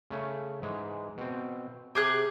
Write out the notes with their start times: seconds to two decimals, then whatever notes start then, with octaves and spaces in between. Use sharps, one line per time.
0.10 C#3 A3 C#4
0.62 G#2 E3 G#3
1.18 B2 C4
1.95 C3 G4 G#4 F#6